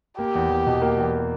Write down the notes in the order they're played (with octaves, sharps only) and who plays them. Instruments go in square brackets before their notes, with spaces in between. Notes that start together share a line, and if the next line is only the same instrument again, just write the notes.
[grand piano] A#3 [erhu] G4
[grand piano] E2
E2
B2
A#3
E2